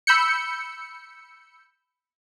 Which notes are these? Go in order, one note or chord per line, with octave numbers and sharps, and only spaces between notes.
B5 E6 G6 C#7